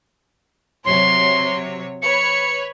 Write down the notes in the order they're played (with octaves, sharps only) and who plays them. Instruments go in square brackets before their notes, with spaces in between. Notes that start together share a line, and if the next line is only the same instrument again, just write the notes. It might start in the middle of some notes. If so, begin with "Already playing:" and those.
[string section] C3 F#3 C#5 [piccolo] C6
[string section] B4 C#5 B5 [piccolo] C#7